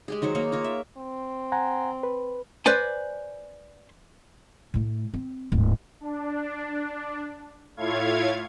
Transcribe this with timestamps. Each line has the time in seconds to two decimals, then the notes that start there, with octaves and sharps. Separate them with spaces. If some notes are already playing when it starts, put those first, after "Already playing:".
0.08 G#3 G4 G#4
0.22 D#3 F#3 C5 C#5
0.35 A#3 G#4 C#5
0.52 F4 A#4 C#5
0.64 E5
0.97 C4
1.52 F#5 G#5 A#5
2.03 B4
2.66 B4 C5 D5 G#5
4.74 A2 A3
5.14 C4
5.52 D1 G#2
6.01 D4
7.77 A2 E4 F4 C#5 F5 G#6